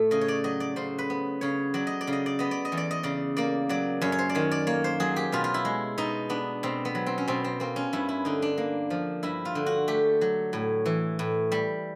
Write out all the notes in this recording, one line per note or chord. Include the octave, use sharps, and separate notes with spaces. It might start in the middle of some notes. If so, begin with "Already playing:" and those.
Already playing: A2 A3
C#3 D#5
C#5
D5
F#3 D#5
D5
C#3 C5
B4
B3
C#3 C#5
F#3 D5
D#5
D5
C#3
D#5
D5
B3 D#5
D5
D#5
E2
D5
D#5
C#3 D5
A#3 D5
F#3 D5
F#2 C#5
C#5
C5
D5
D#3 C#5
D5
A#3 C#5
C5
F#3 G#4
G4
B2 F4
F4
E4
G#3
B2 D#4
B3 D4
B2 C4
B3
F#3
C4
C#4
B2 C4
C4
A#3 C4
C#4
G2 E4
E4
D3 D#4
D4
A#3
F3
G2 E4
F4
D3
F#4
A3 G4
F#3
A2
E3
A2
G3